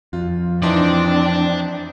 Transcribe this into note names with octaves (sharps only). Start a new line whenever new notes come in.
F2 F4
E3 C4 D4 D#4 D5 A5 C6